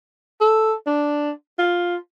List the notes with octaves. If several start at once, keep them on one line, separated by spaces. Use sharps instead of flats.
A4
D4
F4